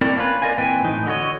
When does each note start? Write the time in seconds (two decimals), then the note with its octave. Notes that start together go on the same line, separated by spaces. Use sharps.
0.01 A3 C4 D4 E4 A#4 D5
0.17 A#3 C#4 F4 B4
0.42 A#4 D5 D#5 F5 G#5
0.58 A#2 E3 C4 B4 G5 G#5
0.84 A2 E3 D#4
1.06 D3 F#4 A#4 C#5 D#5